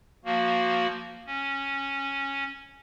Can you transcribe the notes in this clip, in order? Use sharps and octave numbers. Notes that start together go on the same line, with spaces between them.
F3 A#3 F#4
C#4